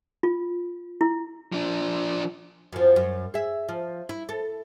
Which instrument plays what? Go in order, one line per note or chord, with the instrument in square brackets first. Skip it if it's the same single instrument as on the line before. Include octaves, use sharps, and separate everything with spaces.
[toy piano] F4
E4
[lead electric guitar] F3 D4
[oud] F#2 F3
F#2
G#4 E5
F3
E4
A4